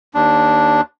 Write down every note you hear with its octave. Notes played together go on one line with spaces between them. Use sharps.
D#2 D4